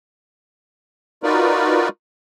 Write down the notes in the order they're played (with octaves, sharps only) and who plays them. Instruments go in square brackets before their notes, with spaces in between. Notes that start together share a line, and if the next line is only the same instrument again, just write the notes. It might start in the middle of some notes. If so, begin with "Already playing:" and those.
[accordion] D#4 F4 F#4 A#4 B4 D5